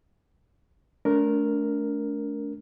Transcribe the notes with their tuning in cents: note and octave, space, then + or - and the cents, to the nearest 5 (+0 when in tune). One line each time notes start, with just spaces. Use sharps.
A3 -20 D4 -40 A#4 +0